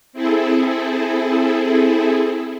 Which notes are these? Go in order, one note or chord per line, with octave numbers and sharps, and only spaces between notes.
C4 E4 G#4 A4